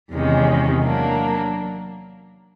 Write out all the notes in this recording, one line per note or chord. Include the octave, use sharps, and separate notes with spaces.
E2 C3 D#3 G#3 C#4
F#3 A#3 D4